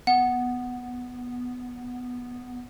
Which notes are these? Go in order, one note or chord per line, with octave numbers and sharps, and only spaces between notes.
B3 F#5